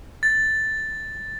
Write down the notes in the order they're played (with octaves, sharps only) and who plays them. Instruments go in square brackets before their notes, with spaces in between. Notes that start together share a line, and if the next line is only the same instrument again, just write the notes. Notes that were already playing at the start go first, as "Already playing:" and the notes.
[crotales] A6